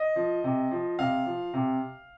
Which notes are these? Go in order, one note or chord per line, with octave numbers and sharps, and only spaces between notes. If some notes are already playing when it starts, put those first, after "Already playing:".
Already playing: D#5
F3
C3
F3
C3 F5
F3
C3